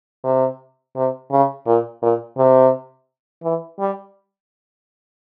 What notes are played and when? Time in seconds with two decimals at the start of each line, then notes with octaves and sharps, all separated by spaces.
0.24 C3
0.96 C3
1.32 C#3
1.67 A#2
2.02 A#2
2.38 C3
3.43 E3
3.79 G3